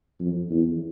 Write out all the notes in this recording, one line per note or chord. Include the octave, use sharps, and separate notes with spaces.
F2
E2